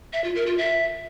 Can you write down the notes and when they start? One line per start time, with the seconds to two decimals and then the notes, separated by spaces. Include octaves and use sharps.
0.13 E5
0.24 F4
0.35 A#4
0.46 F4
0.58 E5